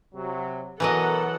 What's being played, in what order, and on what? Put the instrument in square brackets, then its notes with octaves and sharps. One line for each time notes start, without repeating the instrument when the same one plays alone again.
[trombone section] C3 F#3
[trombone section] B2 A#4 [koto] E3 F#3 D#5 [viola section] A4 F#5